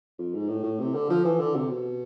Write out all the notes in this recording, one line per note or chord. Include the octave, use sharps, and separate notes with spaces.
F2
G#2
A2
A2
C3
D3
F3
E3
D3
C3
B2